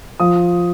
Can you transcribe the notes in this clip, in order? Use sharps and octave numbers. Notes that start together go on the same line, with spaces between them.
F3 D#6